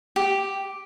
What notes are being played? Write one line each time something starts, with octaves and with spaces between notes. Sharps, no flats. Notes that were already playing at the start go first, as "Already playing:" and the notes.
G4